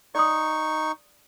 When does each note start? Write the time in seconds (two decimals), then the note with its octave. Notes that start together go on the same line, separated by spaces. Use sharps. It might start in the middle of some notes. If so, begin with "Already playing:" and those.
0.15 D#4 D5 C6 C#6 D#6